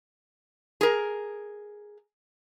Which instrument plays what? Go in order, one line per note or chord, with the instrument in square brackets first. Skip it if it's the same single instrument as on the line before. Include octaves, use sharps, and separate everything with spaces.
[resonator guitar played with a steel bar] G#4 A#4